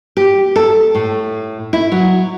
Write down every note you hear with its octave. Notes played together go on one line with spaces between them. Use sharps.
G4
A4
A2
E4
F#3